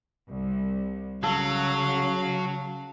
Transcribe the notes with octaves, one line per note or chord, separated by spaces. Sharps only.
C2
C#3 F#3 A4 F5